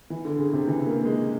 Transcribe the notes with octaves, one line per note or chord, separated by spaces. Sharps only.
E3
D3
C#3
C3
E3
A#3
G#3